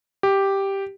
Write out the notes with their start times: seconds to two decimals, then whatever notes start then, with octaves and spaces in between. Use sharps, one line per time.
0.23 G4